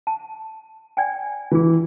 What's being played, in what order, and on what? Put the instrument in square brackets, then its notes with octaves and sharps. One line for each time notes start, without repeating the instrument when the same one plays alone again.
[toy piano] A5
D5 G5 G#5
[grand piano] E3 [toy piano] F4 G#4